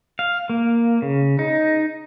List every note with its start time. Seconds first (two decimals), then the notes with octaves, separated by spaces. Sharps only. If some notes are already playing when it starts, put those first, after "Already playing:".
0.19 F5
0.49 A#3
1.02 C#3
1.39 D#4